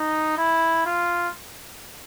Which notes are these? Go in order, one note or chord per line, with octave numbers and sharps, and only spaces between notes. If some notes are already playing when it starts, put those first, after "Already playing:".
Already playing: D#4
E4
F4